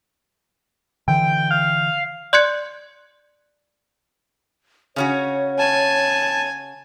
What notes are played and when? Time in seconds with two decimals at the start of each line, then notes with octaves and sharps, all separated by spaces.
1.08 D3 E3 G5
1.51 F5
2.33 D5 C6 F#6 G#6 C#7
4.96 C#3 C#4 F#4 C#5
5.59 G#5 A5